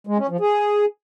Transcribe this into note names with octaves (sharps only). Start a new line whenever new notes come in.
G#3
C#4
F3
G#4